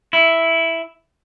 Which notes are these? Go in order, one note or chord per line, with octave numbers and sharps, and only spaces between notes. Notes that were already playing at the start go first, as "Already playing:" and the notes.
E4